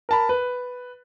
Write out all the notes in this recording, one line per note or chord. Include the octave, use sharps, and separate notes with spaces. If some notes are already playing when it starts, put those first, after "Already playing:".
A#4 A5 B5
B4